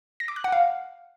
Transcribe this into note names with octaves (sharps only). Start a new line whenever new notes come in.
A#6
D6
F#6
F#5
F5